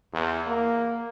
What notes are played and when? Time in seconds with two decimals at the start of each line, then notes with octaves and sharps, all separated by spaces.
0.14 E2
0.47 A#3